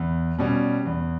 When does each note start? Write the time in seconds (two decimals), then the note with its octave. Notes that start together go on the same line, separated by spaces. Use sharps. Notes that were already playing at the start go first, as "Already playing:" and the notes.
Already playing: E2
0.39 B2 G3 C#4
0.85 E2